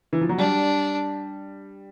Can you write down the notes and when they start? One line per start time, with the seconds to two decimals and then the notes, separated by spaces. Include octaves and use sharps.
0.13 E3
0.21 F3
0.29 F#3
0.38 G3 D4